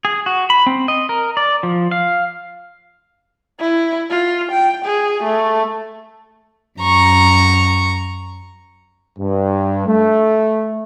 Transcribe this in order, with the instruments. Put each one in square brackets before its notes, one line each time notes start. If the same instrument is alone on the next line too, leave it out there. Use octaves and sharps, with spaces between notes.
[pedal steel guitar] G#4
F#4
B5
C4
D#5
A#4
D5
F3
F5
[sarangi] E4
F4
G5
G#4
A3
[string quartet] F#2 A#5 C#6
[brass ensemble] G2
A3